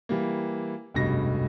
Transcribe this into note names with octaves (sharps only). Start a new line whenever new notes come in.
E3 G3 A#3
F1 C#2 G2 B2 A#6